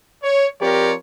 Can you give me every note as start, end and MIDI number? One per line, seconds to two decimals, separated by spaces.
0.23 0.48 73
0.62 0.93 53
0.62 0.93 60
0.62 0.93 67
0.62 0.93 70
0.62 0.93 73
0.62 0.93 74